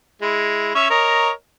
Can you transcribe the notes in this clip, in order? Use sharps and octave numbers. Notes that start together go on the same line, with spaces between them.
G#3 E4
C#4 C#5 E5
A#4 C#5 D#5